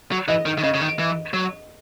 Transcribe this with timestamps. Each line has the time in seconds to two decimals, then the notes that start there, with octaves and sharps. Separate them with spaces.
0.12 F#3
0.28 E3 D#5
0.46 D#3
0.58 D#3
0.63 C#3 D#5
0.74 C#3
0.81 D#3
0.99 E3
1.34 F#3